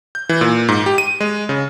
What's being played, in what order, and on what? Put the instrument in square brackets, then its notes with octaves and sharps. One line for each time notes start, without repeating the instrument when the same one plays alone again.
[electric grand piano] G6
E3
A#2
G#2
G4
D#7
G#3
C#3